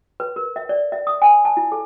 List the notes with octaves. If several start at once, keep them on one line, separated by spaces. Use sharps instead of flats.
B4
A#4
E5
D5
E5
D#6
G#5
A5
E4
A4